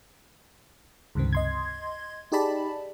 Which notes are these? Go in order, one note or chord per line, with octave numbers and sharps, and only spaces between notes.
C#2 G2 C3 D#3 C4
D#5 C6 G#6
D#4 G4 G#4 D5 A5 B5